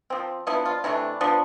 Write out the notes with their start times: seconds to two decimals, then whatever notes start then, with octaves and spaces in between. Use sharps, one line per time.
0.10 F3 C4
0.47 F3 B3 D4 E4
0.66 F4
0.84 C3 E3 A3 D4 E4
1.21 F3 B3 D4